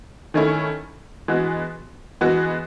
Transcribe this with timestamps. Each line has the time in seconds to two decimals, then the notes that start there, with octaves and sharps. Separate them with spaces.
0.34 D#3 A3 C#4 E4
1.28 E3 G#3 B3 F#4
2.21 E3 G#3 B3 F#4